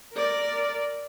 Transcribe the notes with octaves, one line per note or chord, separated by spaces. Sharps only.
A#4 D5